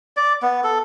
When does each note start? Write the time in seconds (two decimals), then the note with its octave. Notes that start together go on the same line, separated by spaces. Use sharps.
0.17 D5
0.42 B3
0.64 A4